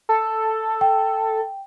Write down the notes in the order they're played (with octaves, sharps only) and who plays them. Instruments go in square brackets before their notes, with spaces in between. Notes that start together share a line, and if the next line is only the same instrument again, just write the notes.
[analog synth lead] A4
[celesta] G5